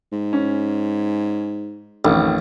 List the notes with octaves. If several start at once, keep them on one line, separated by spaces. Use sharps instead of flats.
G#2
C#4
A1 F2 D#3